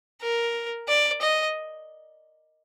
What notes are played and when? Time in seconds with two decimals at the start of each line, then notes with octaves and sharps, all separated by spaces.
0.22 A#4
0.88 D5
1.21 D#5